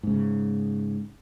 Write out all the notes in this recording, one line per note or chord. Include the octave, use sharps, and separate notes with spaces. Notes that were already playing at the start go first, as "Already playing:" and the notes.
G#2 C#3